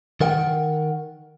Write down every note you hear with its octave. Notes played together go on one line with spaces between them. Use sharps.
D#3 A#4 F#5 G5